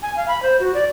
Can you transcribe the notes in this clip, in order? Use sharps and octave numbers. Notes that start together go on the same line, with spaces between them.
G#5
F5
B5
C5
F#4
D5